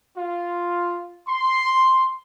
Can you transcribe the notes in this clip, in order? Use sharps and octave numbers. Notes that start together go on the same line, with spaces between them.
F4
C6